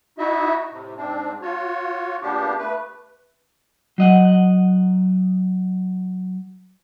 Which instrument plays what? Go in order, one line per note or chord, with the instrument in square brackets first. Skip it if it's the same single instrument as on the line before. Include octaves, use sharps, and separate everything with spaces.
[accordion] D#4 E4 F#4 D#5 E5
A2 C3
G#2 C4 D4
F4 F#4 C#5
A#2 C#3 B3 D4 G4
A3 B4
[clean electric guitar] F#3 D#5 F#5